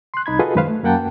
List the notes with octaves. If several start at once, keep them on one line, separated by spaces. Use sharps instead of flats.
C6 F#6
C2 D#4 B5 G#6
F4 F#4 G#4 A4 B4 D#5
F#2 D#3 G#3 B4 C5 F5
A3
F#2 A#3 F#5 G5 A5